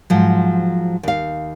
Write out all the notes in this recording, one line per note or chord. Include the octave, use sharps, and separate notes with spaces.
G#2 F3 F#3
D#2 F5